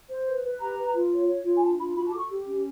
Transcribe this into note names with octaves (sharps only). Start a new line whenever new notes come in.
C5
B4
B4
G4 A#5
B4
F4
C#5
C#5
F4
G#5
D4 A5
F4 B5
F#4 B5
A5
A4 D6
C#6
G4
C#4